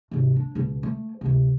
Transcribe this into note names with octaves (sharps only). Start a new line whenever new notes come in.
G#2 C3
D4
C#2 B2
A3
D2 C3